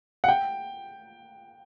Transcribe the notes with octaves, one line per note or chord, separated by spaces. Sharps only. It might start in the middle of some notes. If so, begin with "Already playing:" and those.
F#5
G5